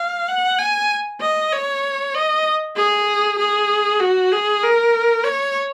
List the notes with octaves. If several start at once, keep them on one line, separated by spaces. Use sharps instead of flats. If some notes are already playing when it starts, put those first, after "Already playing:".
Already playing: F5
F#5
G#5
D#5
C#5
D#5
G#4
G#4
F#4
G#4
A#4
C#5